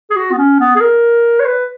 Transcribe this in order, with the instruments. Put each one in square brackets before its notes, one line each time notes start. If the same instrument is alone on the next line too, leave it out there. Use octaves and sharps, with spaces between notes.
[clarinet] G#4
F#4
B3
C#4
B3
G#4
A#4
C#5
B4